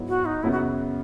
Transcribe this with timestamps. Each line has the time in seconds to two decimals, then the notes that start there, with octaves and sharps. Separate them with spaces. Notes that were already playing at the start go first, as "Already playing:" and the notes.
Already playing: G#2 F#3 B3 E4
0.09 F#4
0.25 D#4
0.43 F#2 C#3 F#3 B3 E4
0.52 F#4